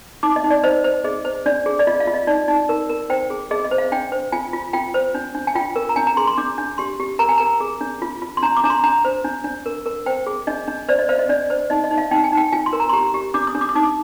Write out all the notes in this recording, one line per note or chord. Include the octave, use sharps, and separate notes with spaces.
D#4 D6
D#5
D#4
D5
C5 D#5
C5
G#4 D#5
C5
D4 D5
G#4
D5
F4 D#5
F5
F4
D#5
D#4 D5
D#4
A#4
A#4
C5 G5
G#4
G#4 D#5
D#5
C5
F5
D4 G5
C5
F4 G#5
F4
F4 G5
C5
D4
D4
G#5
F4 G5
A#4
A#5
D4 G#5
A#5
G#4 C6
C6
D4 D6
D4
G4 C6
G4
A#4 A#5
G#5
A#4 A#5
G#4
D4
F4
F4
C6
D4 A#5
D6
D4 A#5
C6
D4 A#5
C5
D4
D4
A#4
A#4
C5 G5
G#4
D4 D#5
D4
C5 D5
D#5
C5 F5
D#5
D4 D5
C5
D#4 D#5
D#5
D#4
F5
D#4 G5
G#5
D#4
G5
F4 G#5
C6
A#4
A#5
C6
G4 A#5
G4
D4 D6
D#6
D4
D6
D#6
D#4 D6